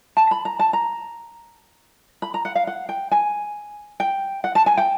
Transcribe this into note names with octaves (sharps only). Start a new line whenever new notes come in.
A5
B5
A#5
A5
A#5
B5
A#5
F#5
F5
F#5
G5
G#5
G5
F#5
A5
G#5
G5